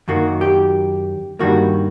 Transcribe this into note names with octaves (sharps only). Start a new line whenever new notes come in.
F#2 D#3 F#3 A#3 F#4
G4
G2 D#3 G3 A#3 F#4